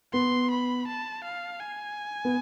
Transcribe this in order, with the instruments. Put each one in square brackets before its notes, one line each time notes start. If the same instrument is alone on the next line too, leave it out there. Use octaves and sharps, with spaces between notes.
[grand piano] B3 [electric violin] C6
[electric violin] B5
A5
F5
G#5
[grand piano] B3